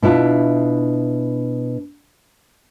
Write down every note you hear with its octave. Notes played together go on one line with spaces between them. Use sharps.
B2 D4 E4 F4